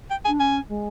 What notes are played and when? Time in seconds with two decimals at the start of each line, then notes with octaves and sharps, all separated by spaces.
0.10 G5
0.25 G#5
0.28 D4
0.39 C#4 G#5
0.69 G#3